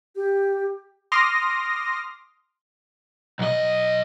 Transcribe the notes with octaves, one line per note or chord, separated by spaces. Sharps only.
G4
C6 D6 D#6 F6 A#6
B1 D#5